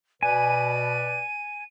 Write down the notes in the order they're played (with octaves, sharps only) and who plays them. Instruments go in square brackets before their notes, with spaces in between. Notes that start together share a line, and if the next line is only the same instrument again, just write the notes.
[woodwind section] B2 B4 D5 [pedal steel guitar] G#5 [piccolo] D#7